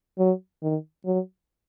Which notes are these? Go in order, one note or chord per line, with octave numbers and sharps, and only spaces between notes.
F#3
D#3
F#3